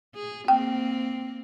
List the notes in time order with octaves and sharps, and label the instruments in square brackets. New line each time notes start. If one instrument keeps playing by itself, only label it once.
[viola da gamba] G#4
[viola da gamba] A#3 C4 [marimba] G5